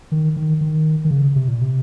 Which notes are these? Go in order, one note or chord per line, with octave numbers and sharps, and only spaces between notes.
D#3
D#3
D#3
D#3
C#3
C3
A#2
C3